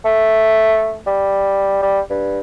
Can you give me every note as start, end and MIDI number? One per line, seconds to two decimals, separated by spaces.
0.05 0.98 57
1.06 1.81 55
1.82 2.00 55
2.10 2.40 43